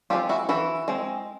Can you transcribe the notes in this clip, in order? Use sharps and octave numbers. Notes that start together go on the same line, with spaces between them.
G#3 C4 F4 G4
E4 F#4
E3 E4 F#4
G#3 C4